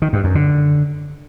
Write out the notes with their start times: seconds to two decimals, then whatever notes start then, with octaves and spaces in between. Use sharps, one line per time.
0.02 D#3
0.13 G2
0.24 F#2
0.35 D3